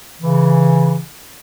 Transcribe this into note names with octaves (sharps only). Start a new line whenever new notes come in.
C#3 E3